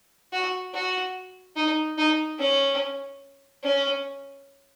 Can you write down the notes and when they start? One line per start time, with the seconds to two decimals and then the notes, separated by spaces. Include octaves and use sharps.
0.32 F#4
0.74 F#4
1.56 D#4
1.98 D#4
2.39 C#4
3.63 C#4